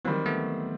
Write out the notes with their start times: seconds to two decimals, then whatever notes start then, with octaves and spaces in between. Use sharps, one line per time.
0.05 D#3 E3 F#3 G3 C4
0.26 A3 B3